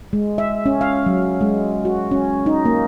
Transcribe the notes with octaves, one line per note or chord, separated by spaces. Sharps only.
G#3
E5
C#4
F5
F#3
G#3
F#4
C#4
D#4
A#3